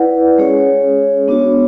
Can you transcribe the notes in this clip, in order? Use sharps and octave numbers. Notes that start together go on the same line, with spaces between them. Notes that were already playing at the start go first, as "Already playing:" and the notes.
Already playing: E4 B4 D5 F#5
G#3 C#4 G#4 C#5
B3 D4 F#4 C#5